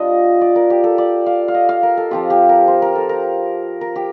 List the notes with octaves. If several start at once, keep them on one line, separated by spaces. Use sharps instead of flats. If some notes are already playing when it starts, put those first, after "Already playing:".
Already playing: G3 D4 F4 D#5
D5
A#4
G4
A4
D5
F5
F5
D#5
F5
A#4
A4
F3 C4 F4 G4
G4
A#4
C5
A#4
A4
A#4
A#4
G4